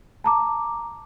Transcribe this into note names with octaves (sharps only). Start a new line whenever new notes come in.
A5 A#5 D6